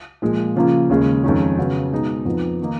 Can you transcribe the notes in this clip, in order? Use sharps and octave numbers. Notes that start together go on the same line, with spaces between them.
A#2 F3 G#3
C#3 F3 A#3 F4
D#2 C#3 G#3
F2 D#3 G#3 C#4
C#3 F#3 B3
B2 G#3 D#4
F2 F3 B3 D#4
D#3 A#3 D#4